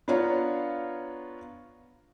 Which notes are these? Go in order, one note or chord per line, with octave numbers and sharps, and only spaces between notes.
B3 D4 F4 C#5 F5 A#5